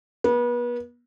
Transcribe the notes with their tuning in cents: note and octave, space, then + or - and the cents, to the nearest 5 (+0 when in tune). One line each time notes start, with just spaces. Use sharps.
B3 -35